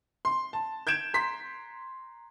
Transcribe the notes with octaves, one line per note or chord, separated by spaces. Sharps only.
C6
A5
G6 G#6 D7 E7
A#5 C6 B6